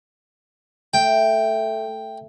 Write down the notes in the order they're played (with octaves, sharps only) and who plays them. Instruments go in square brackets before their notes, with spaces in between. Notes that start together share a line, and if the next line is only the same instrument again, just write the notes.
[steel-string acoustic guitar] A3 [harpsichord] G5